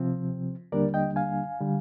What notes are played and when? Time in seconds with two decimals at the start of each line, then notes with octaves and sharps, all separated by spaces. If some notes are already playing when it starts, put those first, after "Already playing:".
Already playing: C3 F3 C4
0.72 D#2 D3 G3 A#3 D4 A#4 D5
0.94 D#5 G5
1.16 F5 G#5
1.60 D3 G3